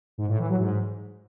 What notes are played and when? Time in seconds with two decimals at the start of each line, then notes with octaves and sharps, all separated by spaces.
0.18 G#2
0.28 A2
0.39 E3
0.49 F#3
0.60 G#2